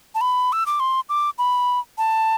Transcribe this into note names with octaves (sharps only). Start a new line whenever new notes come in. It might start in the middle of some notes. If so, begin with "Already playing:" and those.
A5
B5
E6
D6
C6
D6
B5
A5